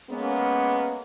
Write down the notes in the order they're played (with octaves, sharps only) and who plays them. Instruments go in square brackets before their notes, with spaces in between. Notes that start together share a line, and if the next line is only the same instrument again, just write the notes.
[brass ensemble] G#3 A#3 B3 C#4